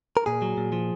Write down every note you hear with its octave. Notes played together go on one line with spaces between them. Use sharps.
A#4
A#2 G#4
F#3
A#2
F3